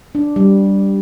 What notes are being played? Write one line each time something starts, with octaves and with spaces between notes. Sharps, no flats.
D4
G3